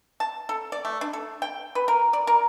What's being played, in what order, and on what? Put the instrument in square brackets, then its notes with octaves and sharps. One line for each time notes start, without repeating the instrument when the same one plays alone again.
[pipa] A5
A4
D5
A3
D4
A4
G5
B4
A#4
D5
A#4